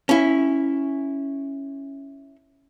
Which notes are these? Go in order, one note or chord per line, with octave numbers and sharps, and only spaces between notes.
C#4 E4